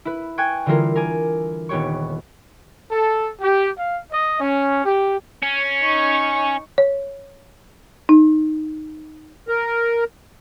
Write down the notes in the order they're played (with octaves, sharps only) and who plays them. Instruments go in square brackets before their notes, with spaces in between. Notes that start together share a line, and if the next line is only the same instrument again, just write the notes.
[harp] E4 B4
G5 G#5 C#6 F#6 G#6
D3 E3 G3 E4 F4 A#4
A#4 G#5 D6
D#1 B3 G4 C#5 C#6
[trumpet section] A4
G4
F5
D#5
C#4
G4
[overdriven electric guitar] C#4
[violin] D#4 C#6
[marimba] C#5
D#4
[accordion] A#4